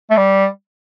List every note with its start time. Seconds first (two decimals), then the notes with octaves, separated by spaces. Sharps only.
0.10 A3
0.17 G3